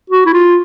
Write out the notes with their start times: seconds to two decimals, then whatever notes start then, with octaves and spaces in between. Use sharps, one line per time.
0.10 F#4
0.26 E4
0.33 F4